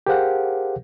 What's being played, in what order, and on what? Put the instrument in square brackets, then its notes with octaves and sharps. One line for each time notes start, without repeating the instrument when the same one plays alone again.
[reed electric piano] G4 G#4 A#4 C5 F5 F#5